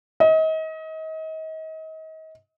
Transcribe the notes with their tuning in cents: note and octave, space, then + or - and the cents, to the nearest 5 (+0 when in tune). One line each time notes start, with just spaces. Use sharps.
D#5 +35